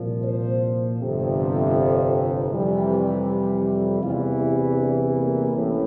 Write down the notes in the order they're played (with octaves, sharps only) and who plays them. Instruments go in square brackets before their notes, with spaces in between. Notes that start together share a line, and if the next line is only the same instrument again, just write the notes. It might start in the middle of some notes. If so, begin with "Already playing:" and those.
Already playing: [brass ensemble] C2 A#2 F3
C5
G1 F2 C3
F2 C3 E3 G3
E2 C3 E3 G3 F4
E4
D4
A#3
A1 A2 E3